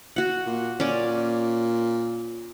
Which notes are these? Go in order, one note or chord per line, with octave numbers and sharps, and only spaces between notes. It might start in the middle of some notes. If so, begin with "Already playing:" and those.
F#4 F#5
A#2
A#2 C#4 D5